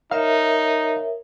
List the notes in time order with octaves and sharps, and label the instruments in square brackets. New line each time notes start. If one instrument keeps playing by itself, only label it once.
[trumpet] D#4 [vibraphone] A#4 C#5 E5 [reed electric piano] F5